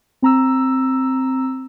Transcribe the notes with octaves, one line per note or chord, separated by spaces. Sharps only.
C4 A#5 E6